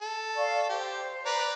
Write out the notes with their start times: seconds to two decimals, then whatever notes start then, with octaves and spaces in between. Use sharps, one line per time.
0.02 A4
0.35 D5 F5 C#6
0.69 G4 C5
1.26 B4 D5 A#5